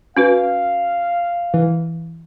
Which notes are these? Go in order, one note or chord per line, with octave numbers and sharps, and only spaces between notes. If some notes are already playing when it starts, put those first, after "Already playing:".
C#4 F#4 B4 F5
E3